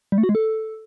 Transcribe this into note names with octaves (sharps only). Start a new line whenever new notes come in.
G3
A3
F#4
G#3
A4